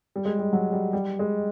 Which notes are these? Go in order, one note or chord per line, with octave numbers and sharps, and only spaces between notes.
G3
G#3
G3
F#3
G3
G3
G#3